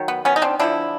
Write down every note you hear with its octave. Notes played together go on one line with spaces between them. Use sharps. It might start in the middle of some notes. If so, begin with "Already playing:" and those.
Already playing: D#3 F#3
B3
B3 C#4
D#4
C4 D4
D3 F3 A#3 D4 E4